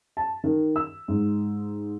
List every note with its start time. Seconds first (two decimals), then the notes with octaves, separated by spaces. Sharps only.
0.17 A5
0.44 D#3
0.76 E6
1.08 G#2